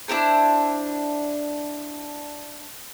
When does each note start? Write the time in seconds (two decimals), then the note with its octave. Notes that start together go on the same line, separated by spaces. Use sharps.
0.08 D4 E4 A#4 C5